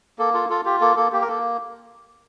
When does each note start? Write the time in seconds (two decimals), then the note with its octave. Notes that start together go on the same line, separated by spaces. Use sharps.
0.19 A#3 A4
0.34 F4 A4
0.50 F4 A4
0.65 F4 G4
0.81 A#3 A4
0.96 A#3 A4
1.12 A#3 G4
1.21 A#4
1.28 A#3 A4